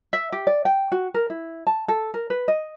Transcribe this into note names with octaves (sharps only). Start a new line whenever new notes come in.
E5
G4
D5
G5
F#4
A#4
E4
A5
A4
A#4
B4
D#5